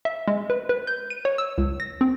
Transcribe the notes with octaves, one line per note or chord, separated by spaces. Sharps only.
E5
G#3
B4
B4
G6
D#7
C#5
E6
C#2
A#6
C4